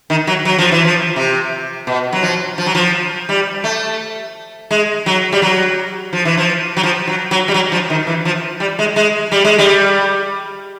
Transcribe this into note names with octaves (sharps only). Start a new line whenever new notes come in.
D#3
F#3
F#3
F3
E3
F3
C3
B2
F#3
F3
F3
F#3
F3
G3
A3
G#3
F#3
G3
F#3
F3
E3
F3
F#3
F3
F#3
F#3
G3
F#3
F3
D#3
E3
F3
G3
G#3
G#3
G3
G#3
G3